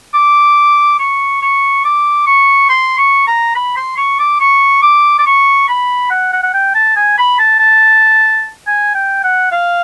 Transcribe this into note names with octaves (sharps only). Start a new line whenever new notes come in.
D6
C#6
C#6
D6
C#6
C6
C#6
A#5
B5
C6
C#6
D6
C#6
D6
D6
C#6
B5
F#5
F#5
F#5
G5
A5
G#5
B5
A5
A5
G#5
G5
F#5
F5